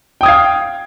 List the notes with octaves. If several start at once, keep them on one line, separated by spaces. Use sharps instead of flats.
F5 G5 D#6 G#6